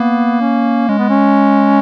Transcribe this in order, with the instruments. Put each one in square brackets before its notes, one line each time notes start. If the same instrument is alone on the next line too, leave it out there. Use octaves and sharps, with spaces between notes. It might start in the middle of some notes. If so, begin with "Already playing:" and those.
Already playing: [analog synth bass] A#3 [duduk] B3
[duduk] C#4
[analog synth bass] G#3 [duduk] C#4
[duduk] B3
C#4